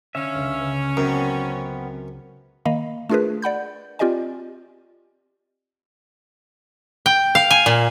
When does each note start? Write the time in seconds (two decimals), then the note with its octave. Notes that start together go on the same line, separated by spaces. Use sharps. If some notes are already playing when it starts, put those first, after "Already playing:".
0.15 D3 C#4 E5 F5
0.34 C#2 C#3
0.61 B4
0.97 F#2 B3 C4 A#4
2.65 D#3 A#3 D#5 F5 B5
3.10 A3 D4 F4 G#4 A#4 B4
3.42 D5 F#5 B5 G6
3.99 C4 F4 G4 D5 D#5 G#5
7.06 G5
7.35 F5
7.51 G#5
7.66 A#2